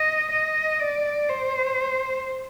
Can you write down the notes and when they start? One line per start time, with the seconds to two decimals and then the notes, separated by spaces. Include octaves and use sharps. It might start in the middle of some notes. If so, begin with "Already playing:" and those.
Already playing: D#5
0.31 D#5
0.80 D5
1.29 C5